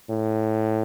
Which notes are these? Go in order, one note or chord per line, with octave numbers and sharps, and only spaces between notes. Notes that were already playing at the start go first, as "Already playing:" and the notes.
A2